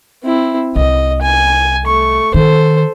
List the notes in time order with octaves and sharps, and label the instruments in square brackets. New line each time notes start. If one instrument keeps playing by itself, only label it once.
[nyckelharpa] C4 E4
[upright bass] C2 [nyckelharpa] D#5
[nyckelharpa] G#5
A3 C#6
[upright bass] D#3 [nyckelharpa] A4 C5